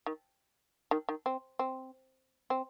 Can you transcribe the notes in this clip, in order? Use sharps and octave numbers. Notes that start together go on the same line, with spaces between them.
D#3
D#3
D#3
C4
C4
C4